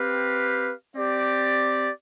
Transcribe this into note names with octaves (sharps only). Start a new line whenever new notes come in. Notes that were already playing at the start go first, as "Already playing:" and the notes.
Already playing: C4 G4 B4 F5
C4 G4 D5